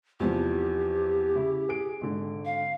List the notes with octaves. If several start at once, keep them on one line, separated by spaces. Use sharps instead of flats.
E2 C3 F3 G4
C#3 E4
G#4 D7
G#1 D3
F5